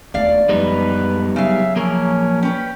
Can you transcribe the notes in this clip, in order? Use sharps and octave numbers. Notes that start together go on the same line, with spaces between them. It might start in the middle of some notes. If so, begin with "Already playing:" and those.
E1 D#2 A3 D5 F5
F#2 F3 G3 G#3 B3 D#4 B4
C#3 F#3 E5 F5
F3 A#3 C#4 A#4
C#4 B4 G5